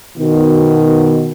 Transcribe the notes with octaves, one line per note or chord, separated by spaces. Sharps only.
B2 D#3